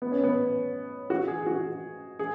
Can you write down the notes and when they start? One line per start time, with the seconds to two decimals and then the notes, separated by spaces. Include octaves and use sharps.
0.02 B3
0.12 C#4
0.24 B3
1.10 F#4
1.28 G#4
1.47 F#4
2.19 G#4